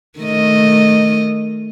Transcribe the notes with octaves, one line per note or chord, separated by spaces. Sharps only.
D#3 A3 D#5